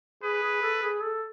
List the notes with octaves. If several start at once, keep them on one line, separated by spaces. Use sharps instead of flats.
G#4 B4
G#4
A4
G#4
A4